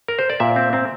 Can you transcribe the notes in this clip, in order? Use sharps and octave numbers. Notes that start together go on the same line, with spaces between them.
A#4
C5
D5
A#2 E5
C4
C4